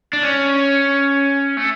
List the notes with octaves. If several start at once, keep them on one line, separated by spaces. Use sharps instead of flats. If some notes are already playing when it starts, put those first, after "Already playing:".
D4
C#4
A3